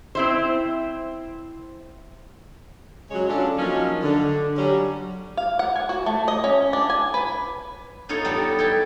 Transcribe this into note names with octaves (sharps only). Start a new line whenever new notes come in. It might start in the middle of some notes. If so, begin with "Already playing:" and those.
C4 E4 C5
C#3 F#3 G#3 C#5
D3 F#3 C#4 D4 F4 A4
F3 F#3 A#3 C#4 D#4
D3
F#3 G3 C#4
F5
F#5
G#5
F#4
A3
D#5
C#4
D4
G#5
B4
B3 D#4 F4 A4 C#5
G3 B3 D#4 A4
E4 A4 G5 A5